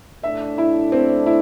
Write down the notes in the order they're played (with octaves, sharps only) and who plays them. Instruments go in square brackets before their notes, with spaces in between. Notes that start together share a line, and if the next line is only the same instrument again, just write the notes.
[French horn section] A2 A3 D4 [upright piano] E5
[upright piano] E4
C4
E4